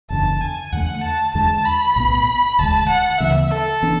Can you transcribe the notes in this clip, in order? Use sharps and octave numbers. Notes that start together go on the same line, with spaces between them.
F#1 E2 D3 A5
G#5
E2 D3 A3 F#5
A5
E2 D3 G#3 A5
B5
B1 A2 E3 B3
E1 D2 D3 G#3 A5
F#5
D2 C#3 E3 B3 E5
A4
E3 B3 D4